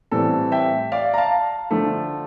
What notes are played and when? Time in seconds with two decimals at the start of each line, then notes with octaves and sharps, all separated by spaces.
0.11 A2 E3 G3 C4 A4
0.52 E5 G5
0.92 D5 F5
1.14 A#5
1.18 F5 A5
1.71 D3 F3 A3